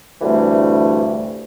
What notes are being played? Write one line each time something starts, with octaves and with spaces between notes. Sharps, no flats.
D2 G2 C3 E3 G3 A3